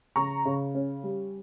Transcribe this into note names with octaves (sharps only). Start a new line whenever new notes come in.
C#3 A#5 C#6
C#3
C#4
G3